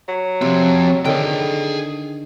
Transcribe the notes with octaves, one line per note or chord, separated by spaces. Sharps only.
F#3
C3 F3 C4
D3 D#3 G#4 G5